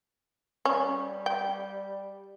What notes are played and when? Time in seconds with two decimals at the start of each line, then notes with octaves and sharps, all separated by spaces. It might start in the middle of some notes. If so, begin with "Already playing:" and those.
0.65 G3 C#4
1.26 G5